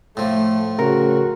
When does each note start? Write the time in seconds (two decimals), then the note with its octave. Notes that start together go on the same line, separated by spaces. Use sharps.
0.17 A2 F3 A3
0.79 C#3 F#4 A#4